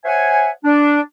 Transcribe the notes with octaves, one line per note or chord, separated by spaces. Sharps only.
C5 C#5 E5 F#5 G#5
D4